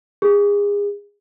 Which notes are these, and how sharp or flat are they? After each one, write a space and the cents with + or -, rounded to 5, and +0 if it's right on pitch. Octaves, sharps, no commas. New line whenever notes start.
G#4 -30